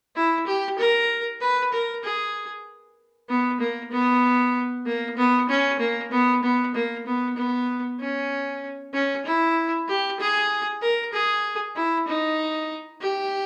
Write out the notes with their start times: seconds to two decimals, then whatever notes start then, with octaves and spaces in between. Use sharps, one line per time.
0.16 E4
0.46 G4
0.78 A#4
1.41 B4
1.72 A#4
2.03 G#4
3.29 B3
3.60 A#3
3.91 B3
4.86 A#3
5.17 B3
5.49 C#4
5.79 A#3
6.11 B3
6.43 B3
6.74 A#3
7.06 B3
7.37 B3
7.99 C#4
8.93 C#4
9.25 E4
9.88 G4
10.19 G#4
10.82 A#4
11.13 G#4
11.76 E4
12.07 D#4
13.01 G4